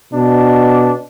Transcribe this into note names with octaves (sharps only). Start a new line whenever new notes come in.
B2 D4